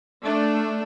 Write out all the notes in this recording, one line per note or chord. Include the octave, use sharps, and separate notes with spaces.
A3 D4